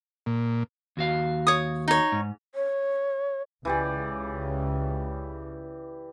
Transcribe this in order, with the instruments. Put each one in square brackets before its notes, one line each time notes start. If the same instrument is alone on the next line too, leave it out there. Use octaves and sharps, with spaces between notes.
[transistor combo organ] A#2
[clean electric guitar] D#2 F#4 F5
[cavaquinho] C#5 D#6
D#4 C#5
[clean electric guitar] G#2
[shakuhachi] C#5
[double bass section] C#2 C#3 [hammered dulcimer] E3 G4 D5